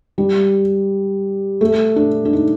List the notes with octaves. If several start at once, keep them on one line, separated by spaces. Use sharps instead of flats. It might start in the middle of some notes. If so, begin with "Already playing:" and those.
G3
A3
D4
D4
D#4